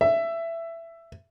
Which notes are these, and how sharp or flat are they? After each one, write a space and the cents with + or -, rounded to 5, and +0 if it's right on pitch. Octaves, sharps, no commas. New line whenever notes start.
E5 +15